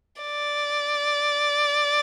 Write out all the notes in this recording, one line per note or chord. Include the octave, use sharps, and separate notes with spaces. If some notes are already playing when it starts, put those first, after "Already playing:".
D5